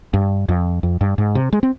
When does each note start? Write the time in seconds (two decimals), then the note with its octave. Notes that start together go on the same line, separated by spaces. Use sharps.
0.14 G2
0.49 F2
0.83 F2
1.01 G2
1.18 G#2
1.35 C3
1.53 G#3
1.63 C4